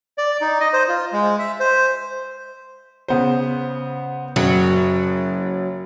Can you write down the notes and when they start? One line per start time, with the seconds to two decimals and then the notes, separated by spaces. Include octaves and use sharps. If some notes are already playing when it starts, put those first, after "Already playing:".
0.18 D5
0.41 D#4
0.61 D#5
0.74 C5
0.88 F4
1.12 G#3
1.39 E5
1.60 C5
3.08 C#3 B3 C5
4.36 F#1 F#3